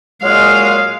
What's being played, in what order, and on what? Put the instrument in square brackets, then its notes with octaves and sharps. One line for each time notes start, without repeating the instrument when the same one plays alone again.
[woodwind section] A#2 F#3 G#3 [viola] F5